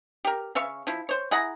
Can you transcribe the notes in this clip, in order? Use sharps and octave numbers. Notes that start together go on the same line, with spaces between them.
G4 A#4
C#3 E5 F5 C#6
F3 E4
C5 C#5
E4 G#4 F#5 A#5